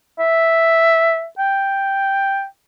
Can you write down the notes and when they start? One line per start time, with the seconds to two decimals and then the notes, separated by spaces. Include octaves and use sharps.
0.19 E5
1.39 G5